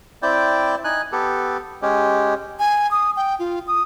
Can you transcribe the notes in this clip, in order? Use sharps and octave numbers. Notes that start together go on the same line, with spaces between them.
C4 E4 D5 G5
D#4 G#5 F#6
B3 G4 A4
G#3 C#4 G4
G#5
D#6
G5
F4
D#6